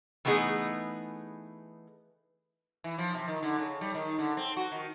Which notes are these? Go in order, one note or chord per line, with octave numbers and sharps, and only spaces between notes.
E3 A3 B3 D#4 G#4
E3
F3
C3
D#3
D3
C#3
G3
D#3
D3
C4
F#4
D#3